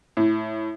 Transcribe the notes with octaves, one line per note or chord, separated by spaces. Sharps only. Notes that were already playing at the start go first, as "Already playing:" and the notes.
A2